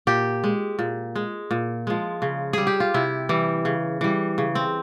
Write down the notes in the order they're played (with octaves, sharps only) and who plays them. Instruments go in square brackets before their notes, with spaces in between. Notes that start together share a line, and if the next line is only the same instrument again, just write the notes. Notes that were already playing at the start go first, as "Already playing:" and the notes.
[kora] A#2 G4
G#3
A#2
G#3
A#2
F3 G#3
C#3
G3 G#4
G4
F4
C3 E4
E3 G3
C#3
E3 G3
C#3
C4